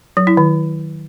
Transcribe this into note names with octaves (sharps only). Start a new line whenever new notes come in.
F#3
E4
D#3